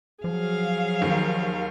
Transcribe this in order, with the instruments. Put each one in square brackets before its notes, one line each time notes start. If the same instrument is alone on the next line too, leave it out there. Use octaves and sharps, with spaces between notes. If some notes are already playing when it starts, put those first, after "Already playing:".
[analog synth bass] F3 [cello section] F#3 F5 [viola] G#4
[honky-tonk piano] D#2 D#3